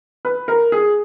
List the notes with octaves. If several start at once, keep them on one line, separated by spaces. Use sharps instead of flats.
B4
A#4
G#4